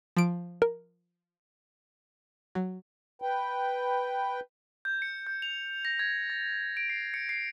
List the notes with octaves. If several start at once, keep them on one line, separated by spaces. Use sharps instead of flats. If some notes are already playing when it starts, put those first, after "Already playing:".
F3 D7
A#4
F#3
B4 G5
G6
C#7
G6
F7
A#6
G#6
A6
D7
C7
C#7
C7